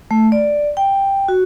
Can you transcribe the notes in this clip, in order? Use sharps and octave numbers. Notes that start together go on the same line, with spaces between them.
A3
D5
G5
F#4